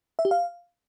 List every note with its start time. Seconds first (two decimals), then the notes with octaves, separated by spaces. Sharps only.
0.19 E5
0.25 G4
0.31 F5